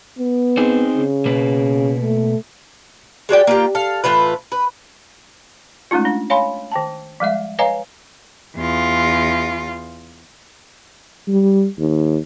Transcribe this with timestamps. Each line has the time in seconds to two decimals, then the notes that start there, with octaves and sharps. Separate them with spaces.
0.19 B3
0.57 C4 D#4 G#4
0.96 C#3
1.25 B2 A#3 B4
2.01 A3
3.29 G#3 F#4 D5 G5
3.47 A#3 F4 G4
3.75 A4 F5
4.04 A2 E3 F4 B4
4.52 B4
5.91 G#3 A3 C#4 D#4 F4
6.05 D4
6.30 C#5 F5 G#5 B5 C6
6.72 D#3 G5 A5
7.20 F3 G3 G#3 E5
7.59 B4 C#5 D#5 F5 G#5 A#5
8.57 E2 F4
11.27 G3
11.78 D#2